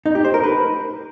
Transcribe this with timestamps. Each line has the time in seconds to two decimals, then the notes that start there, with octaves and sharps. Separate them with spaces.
0.06 D#4
0.15 G4
0.25 C5
0.34 A#4
0.44 B4